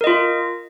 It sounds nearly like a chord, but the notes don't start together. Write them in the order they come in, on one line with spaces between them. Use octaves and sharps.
A#4 D#5 F4